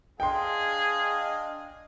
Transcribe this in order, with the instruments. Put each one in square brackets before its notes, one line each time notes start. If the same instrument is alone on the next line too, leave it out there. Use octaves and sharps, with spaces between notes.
[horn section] D4 D#5 F5 [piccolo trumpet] G#4 [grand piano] G5 C6